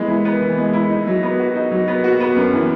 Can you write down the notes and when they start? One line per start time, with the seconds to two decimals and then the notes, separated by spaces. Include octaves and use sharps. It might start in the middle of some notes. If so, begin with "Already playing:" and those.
Already playing: E3 G#3 B3
0.08 E4
0.25 B3
0.41 E3
0.58 G#3
0.73 E4
0.90 D#4
1.07 F#3
1.23 B3
1.39 F#4
1.55 D#4
1.71 F#3
1.88 B3
2.04 F#4
2.20 B3
2.36 F#2
2.53 E3